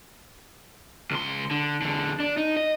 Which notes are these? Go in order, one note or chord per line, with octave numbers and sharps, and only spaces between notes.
C#2 C6
D3
E2 D3
D4
D#4
D#5